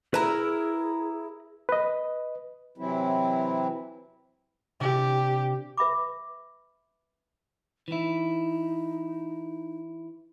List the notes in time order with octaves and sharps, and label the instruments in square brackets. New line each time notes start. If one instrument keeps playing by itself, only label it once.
[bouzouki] E4 A#4 [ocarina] G#4 [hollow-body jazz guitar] B4 A#5
[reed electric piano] B4 D#5
[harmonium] C3 E3 F#3 C4 E4
[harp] C3 D4 [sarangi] G4
[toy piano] B4 E5 B5 D6
[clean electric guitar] E3 E4 [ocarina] D#4